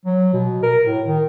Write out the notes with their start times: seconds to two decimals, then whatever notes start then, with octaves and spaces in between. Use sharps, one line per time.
0.05 F#3
0.33 B2
0.63 A#4
0.85 A2
1.06 D#3